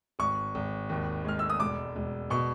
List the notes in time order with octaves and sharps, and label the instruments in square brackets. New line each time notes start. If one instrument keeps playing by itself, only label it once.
[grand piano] G#1 C#6
G#1
D#2
G#3 F6
E6
D#6
E1 D6
E1
B2 C#6